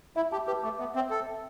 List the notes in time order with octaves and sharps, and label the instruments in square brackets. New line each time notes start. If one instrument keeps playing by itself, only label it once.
[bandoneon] E4 [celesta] E5
[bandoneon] G4 [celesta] A5
[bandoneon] G4 [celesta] B4
[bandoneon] A3 [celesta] D6
[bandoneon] B3 [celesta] E5
[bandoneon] C4 [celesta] E5
[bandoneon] A4 [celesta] E5
[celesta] E5